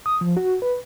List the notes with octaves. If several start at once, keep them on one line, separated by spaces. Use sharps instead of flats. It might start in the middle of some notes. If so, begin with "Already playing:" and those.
D#6
F3
F#4
B4